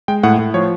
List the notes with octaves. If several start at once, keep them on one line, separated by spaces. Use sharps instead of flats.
G#3 G5
A2 F#5
A2
F3 C#5